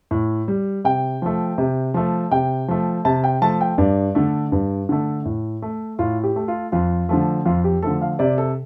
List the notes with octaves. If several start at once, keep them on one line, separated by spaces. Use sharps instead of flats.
A2
G3
C3 G5
F3 A3
C3
F3 A3
C3 G5
F3 A3
C3 A5
G5
F3 A3 A5
G5
G2 D5
D3 A3
G2
D3 A3
A2
A3
A2 F4
G4
A3
F4
F2 F4
D3 F3 A3
F2 F4
G4
D3 F3 A3 A4
F5
C3 D5
A4